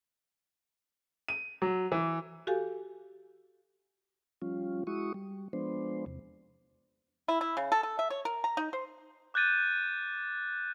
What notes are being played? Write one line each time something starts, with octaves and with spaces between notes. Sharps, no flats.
D#7
F#3
E3
F#4 G4 A4 F5 G#5
F3 G3 C#4 F4
G#3 E4 F#4 C#6 D#6
G3
F3 G#3 B3 D4 C5
E2 C3
E4
E4
C#3
A4
A4
E5
C#5
A#4
A#5
D#4
C5
D6 F#6 G6 A6 D#7